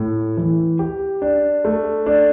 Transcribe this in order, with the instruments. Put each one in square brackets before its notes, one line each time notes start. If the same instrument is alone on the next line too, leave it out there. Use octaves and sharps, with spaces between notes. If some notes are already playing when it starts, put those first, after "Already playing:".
Already playing: [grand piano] A2
E3
G4
D4
A3
D4